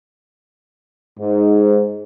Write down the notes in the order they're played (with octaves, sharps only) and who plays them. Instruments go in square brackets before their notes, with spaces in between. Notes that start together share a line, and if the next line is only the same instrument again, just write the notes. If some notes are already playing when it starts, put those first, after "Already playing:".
[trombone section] G#2